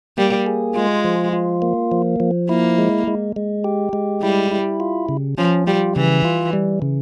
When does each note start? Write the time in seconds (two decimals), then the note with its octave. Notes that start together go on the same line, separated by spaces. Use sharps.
0.18 G3 A#3
0.46 G#4
0.75 G#3 F4
1.04 F3
1.33 F4
1.62 A#3
1.92 F3
2.20 F3
2.49 A#3 E4
2.78 G#3
3.07 G#3
3.36 G#3
3.64 G4
3.93 G#3
4.23 G3 E4
4.51 E4
4.80 F4
5.09 C#3
5.38 F3 C#4
5.67 G3 F4
5.96 C#3 E3
6.24 F4
6.53 G3
6.82 C#3